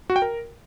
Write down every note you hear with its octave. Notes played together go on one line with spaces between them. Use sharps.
F#4
G5
A#4